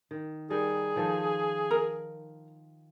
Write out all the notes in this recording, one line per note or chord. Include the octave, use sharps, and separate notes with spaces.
D#3
G3 D#4 G#4 A#4
D#3 F3 A4
A#4